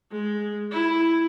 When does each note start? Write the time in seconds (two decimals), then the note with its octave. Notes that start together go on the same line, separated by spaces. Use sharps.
0.12 G#3
0.72 E4